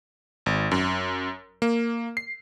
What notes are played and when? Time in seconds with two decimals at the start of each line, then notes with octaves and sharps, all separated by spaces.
0.46 G#1
0.71 F#2
1.62 A#3
2.17 C7